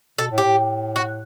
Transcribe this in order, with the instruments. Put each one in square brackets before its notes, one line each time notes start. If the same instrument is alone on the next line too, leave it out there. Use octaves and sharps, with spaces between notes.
[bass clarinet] B2 [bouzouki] A4
[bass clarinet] A2
[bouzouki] G4
[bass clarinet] A2
[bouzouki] F#4